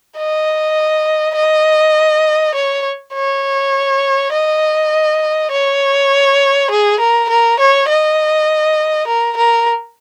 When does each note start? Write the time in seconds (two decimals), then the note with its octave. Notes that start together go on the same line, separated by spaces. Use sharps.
0.17 D#5
1.35 D#5
2.54 C#5
3.14 C#5
4.32 D#5
5.51 C#5
6.70 G#4
7.00 A#4
7.29 A#4
7.59 C#5
7.89 D#5
9.07 A#4
9.37 A#4